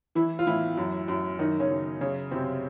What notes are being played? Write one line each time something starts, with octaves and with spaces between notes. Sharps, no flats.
E3 E4
F4
A2 E3 E4
F#2
F#2
F#2 D#3 D#4
C#3 C#4
F#2
F#2 C#3 C#4
F#2 C3 C4